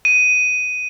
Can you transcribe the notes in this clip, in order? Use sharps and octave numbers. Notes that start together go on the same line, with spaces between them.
D#7